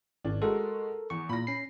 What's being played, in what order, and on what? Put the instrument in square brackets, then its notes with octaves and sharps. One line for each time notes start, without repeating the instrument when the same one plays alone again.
[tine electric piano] G#1 [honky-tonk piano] C#4 D4
[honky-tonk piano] G#3 A3 F#4 [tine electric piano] A4 A#4
[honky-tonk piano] E2 [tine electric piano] C#6
[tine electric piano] A#2 [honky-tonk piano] B5 A#6
[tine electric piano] C#4 C7